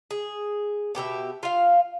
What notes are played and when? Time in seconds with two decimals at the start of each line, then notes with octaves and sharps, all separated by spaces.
0.11 G#4
0.95 B2 G4 A#4 E5
1.43 F4 F5